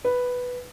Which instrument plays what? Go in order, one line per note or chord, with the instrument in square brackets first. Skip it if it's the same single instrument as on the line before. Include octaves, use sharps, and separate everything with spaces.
[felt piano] B4